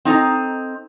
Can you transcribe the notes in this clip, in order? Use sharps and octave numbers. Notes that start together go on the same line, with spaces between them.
C4 D#4 A4 D#5 A#5